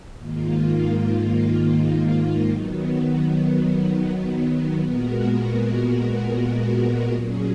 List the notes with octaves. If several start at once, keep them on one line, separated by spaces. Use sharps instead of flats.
G#2 D#3 A#3 F4
D#3 F#3 B3
A#2 G#3 B3 F#4 A#4
A#2 F#3 C#4 G#4